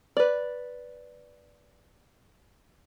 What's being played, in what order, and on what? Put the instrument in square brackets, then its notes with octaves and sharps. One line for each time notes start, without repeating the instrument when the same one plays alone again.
[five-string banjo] B4 D5